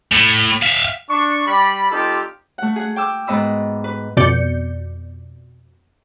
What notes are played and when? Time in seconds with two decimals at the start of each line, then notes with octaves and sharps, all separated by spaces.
0.12 A2
0.63 E5 F5
1.10 D4 C#6
1.47 G3 D5 B5
1.91 G3 C4 D#4 F4 G4 A4
2.58 A3 F#5
2.76 G#4 F#5
2.96 G5 D6 E6
3.27 G#2 B3 D#5 B5 E6
3.84 B4
4.17 F2 B2 D5 G6 C#7